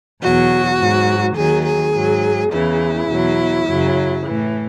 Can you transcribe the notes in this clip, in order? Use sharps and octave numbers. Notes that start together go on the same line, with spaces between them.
E2 B2 F#3 F#4
G#2 F#3
D#2 D#3 F#3 G#4
G#4
G#2 F#3
E2 C#3 E3 E4
E2 B2 F#3
F#2 C#3 F#3
A2 E3